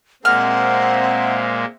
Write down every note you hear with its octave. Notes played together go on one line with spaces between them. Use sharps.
A#2 G#3 A#3 C4 C5 E5 F#5 F6